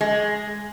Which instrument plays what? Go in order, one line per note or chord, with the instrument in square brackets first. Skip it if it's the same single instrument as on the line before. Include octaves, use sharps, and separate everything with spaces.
[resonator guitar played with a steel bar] G#3